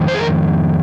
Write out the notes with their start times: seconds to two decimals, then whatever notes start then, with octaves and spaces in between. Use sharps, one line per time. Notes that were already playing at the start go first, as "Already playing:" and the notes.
Already playing: F2 D#3 G#3
0.08 C5
0.15 G#4
0.19 A#4